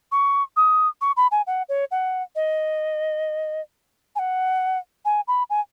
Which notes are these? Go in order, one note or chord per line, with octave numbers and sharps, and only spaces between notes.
C#6
D#6
C#6
B5
G#5
F#5
C#5
F#5
D#5
G#5
F#5
G#5
B5
G#5